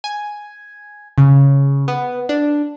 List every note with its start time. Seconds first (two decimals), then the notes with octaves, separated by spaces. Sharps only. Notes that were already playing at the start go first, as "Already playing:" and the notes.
0.04 G#5
1.18 C#3
1.88 B3
2.29 D4